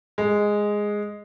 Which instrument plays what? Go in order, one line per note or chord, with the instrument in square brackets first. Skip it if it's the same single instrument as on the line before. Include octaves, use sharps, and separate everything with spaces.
[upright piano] G#3